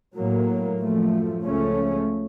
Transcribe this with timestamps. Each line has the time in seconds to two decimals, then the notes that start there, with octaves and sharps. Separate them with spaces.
0.15 A2 F#3 A#3
0.79 F#2 F3 A3
1.43 C#2 C#3 F3 A3 C#4